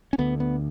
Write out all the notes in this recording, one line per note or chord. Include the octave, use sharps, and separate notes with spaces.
C#4
D2 D3 B3
B3